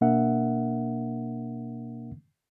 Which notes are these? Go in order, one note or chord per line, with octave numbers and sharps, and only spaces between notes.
B2 A#3 D4 A#4 E5 F#5